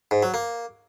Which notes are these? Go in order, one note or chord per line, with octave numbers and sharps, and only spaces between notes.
G#2
F#3
A#3